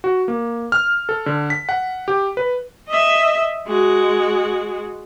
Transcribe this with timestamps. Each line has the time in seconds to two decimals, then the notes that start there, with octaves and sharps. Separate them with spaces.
0.04 F#4
0.28 A#3
0.72 F6
1.09 A4
1.26 D3
1.50 B6
1.69 F#5
2.08 G4
2.37 B4
2.88 D#5 E5
3.67 G#3 F#4